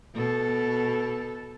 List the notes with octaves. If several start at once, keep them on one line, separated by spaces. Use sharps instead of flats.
B2 A4